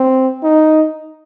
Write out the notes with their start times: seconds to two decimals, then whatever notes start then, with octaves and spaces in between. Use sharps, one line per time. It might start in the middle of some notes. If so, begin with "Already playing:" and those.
Already playing: C4
0.43 D#4